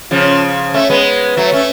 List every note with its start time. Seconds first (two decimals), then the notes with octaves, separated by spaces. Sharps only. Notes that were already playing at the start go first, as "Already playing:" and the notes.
0.11 C#3 F3
0.74 A3 C#4
0.90 G#3 B3
1.37 F#3 A3
1.52 A3 C#4